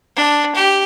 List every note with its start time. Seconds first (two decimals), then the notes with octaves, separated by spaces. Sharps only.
0.17 D4
0.56 G4